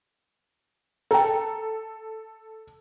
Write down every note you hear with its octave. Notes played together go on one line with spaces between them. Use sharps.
A4 G5 A#5